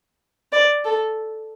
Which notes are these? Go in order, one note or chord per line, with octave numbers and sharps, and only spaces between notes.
D5
A4